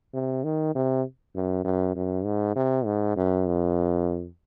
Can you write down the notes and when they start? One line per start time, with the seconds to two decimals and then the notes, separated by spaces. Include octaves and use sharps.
0.14 C3
0.44 D#3
0.75 C3
1.35 F#2
1.65 F#2
1.96 F#2
2.25 G#2
2.56 C3
2.86 G#2
3.17 F#2
3.47 F2